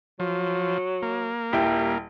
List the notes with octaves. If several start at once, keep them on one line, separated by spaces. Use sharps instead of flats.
F3 F#3
A#3
D#1 G3 E4 G5